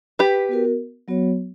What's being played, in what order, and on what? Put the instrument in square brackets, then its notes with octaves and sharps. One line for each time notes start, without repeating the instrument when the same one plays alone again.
[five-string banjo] G4 B4
[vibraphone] B3 F#4 A#4
F#3 B3 F#4 C#5